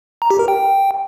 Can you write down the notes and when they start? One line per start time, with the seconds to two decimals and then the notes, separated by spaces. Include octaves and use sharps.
0.22 A#5
0.31 G4
0.39 A#4
0.48 G5